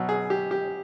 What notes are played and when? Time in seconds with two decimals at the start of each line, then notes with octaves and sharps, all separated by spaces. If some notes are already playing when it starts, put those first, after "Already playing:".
Already playing: B2 F#3
0.09 G#4
0.30 G4
0.51 G4